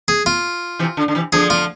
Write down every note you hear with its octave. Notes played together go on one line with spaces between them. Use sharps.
G#4
F4
C3 E3
D3
D3
C3 E3
D3 F3 G#4
F4